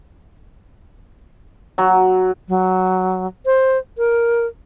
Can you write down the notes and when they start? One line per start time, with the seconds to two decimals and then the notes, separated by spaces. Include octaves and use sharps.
1.78 F#3
2.47 F#3
3.46 C5
3.98 A#4